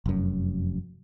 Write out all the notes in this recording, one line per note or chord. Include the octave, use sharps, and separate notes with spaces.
F1 F#2